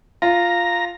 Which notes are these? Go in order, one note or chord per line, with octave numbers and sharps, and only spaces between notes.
F4 A#5